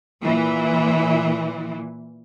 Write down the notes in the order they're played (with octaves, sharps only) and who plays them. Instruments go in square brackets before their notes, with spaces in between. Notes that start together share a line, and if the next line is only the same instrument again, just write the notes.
[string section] A#2 E3